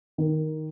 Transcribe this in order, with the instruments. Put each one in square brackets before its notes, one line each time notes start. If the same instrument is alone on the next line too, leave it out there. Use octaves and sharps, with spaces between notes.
[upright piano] D#3